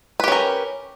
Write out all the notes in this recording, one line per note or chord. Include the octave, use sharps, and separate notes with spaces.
C#4 G4 A#4 B4